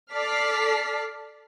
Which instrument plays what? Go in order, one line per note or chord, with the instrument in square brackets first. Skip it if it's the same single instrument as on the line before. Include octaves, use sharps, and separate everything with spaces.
[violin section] A4 D5 A5 F6 B6 C7